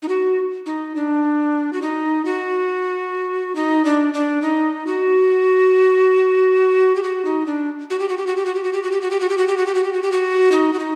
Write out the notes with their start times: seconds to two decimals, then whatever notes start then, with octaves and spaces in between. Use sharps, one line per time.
0.02 D#4
0.09 F#4
0.66 D#4
0.96 D4
1.73 F#4
1.82 D#4
2.25 F#4
3.55 D#4
3.85 D4
4.14 D4
4.42 D#4
4.87 F#4
6.96 G4
7.03 F#4
7.25 D#4
7.46 D4
7.90 F#4
8.00 G4
8.09 F#4
8.18 G4
8.27 F#4
8.37 G4
8.46 F#4
8.55 G4
8.64 F#4
8.73 G4
8.83 F#4
8.92 G4
9.02 F#4
9.11 G4
9.20 F#4
9.29 G4
9.38 F#4
9.48 G4
9.57 F#4
9.67 G4
9.75 F#4
9.84 G4
9.93 F#4
10.03 G4
10.12 F#4
10.52 D#4
10.73 F#4
10.79 D#4